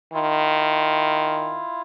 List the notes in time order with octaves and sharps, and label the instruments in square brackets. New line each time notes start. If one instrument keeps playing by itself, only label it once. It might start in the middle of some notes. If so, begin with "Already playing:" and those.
[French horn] D#3 [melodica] E4 F4